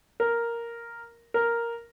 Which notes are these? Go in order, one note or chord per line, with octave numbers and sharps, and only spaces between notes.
A#4
A#4